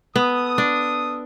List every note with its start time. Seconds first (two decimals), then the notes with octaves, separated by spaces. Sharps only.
0.16 B3 A4 D#6
0.58 D4